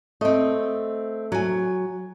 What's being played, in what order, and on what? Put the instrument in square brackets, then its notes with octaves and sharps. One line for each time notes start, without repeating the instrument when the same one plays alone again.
[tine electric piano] A3 [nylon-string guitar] C4 D#5
[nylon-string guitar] F#3 G#5